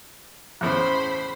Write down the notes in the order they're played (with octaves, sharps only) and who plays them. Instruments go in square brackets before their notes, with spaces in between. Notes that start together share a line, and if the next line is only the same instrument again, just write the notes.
[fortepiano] E2 A2 C#3 [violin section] C5 B5